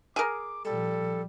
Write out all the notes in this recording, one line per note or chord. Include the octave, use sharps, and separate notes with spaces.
G#4 A#4 D6
A#2 F3 G3 A4